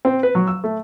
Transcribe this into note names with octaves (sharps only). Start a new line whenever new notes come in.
C4
B4
F#3
E6
A3